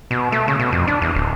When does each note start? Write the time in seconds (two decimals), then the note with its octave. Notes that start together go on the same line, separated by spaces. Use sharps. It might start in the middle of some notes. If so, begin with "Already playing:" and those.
0.11 B2
0.32 A3
0.48 C#3
0.59 B2
0.72 F2
0.88 D4
1.02 E2
1.15 D1